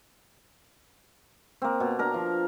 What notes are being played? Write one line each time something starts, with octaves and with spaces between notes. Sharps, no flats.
A#3 C4
B2
D4 A#4 A#5
F3